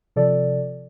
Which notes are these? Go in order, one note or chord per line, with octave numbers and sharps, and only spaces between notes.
C3 F3 A4 D5